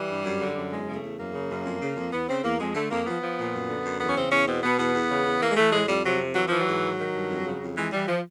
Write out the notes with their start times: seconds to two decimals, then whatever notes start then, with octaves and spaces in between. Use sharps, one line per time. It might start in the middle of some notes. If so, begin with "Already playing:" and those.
Already playing: E3 G3
0.08 G2
0.24 F#2
0.40 D3
0.56 F#2
0.71 E2 G#3
0.87 C#3
0.95 A3
1.03 E2
1.18 F#2 A#3
1.34 C#3
1.50 F#2
1.65 F2
1.81 C#3
1.96 F2
2.12 E2 B3
2.28 C#3 C4
2.43 E2 A#3
2.59 F2 G#3
2.75 D3 A3
2.91 F2 A#3
3.06 F3 B3
3.22 F3
3.38 A#2
3.54 F#2
3.69 D3
3.84 F#2
4.00 E2 B3
4.08 C#4
4.16 C#3 C4
4.31 E2 C#4
4.47 B2 C4
4.63 B2 B3
4.79 E2 B3
4.94 E2
5.10 C#3
5.26 E2
5.41 E3 A#3
5.50 G#3
5.57 E3 A3
5.73 A2 G#3
5.89 F2 G3
6.04 C3 F#3
6.20 F2
6.35 E3 F#3
6.48 E3 F3
6.61 F#3
6.66 G#2
6.82 D#3
6.98 D#3
7.14 G2
7.29 F2
7.45 C#3
7.61 F2
7.76 E3 G#3
7.92 E3 G3
8.07 F3